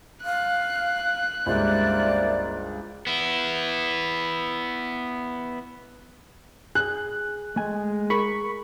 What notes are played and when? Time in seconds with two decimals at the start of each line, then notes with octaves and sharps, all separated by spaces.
0.25 F5 F#6
1.46 C#2 G2 A#3 E4 C5 D5
3.07 B3 E4
6.75 G#4 F#6
7.56 G#3 A3 G#5
8.10 G#4 A#4 B5 C#6